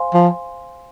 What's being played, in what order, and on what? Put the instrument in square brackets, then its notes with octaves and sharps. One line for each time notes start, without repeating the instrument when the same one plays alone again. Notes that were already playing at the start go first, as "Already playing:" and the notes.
Already playing: [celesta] C5 F5 G#5 C6
[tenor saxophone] F3